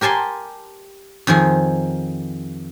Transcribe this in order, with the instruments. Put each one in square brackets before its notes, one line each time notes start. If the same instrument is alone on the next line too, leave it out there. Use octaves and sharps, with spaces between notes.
[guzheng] G4 A#4 G#5 A5 C6
F2 D#3 F3 G#4